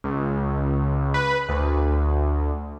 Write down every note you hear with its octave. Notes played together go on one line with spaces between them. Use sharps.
C#2
B4
D2